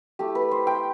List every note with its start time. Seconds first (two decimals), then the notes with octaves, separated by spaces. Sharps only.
0.19 A3 E4 G4
0.35 B4
0.51 C5
0.67 G5